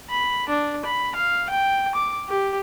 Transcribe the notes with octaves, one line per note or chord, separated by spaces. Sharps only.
B5
D4
B5
F5
G5
D6
G4